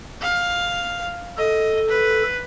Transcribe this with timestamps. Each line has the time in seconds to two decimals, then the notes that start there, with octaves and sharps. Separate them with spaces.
0.21 F5
1.38 A4 D#5
1.88 B4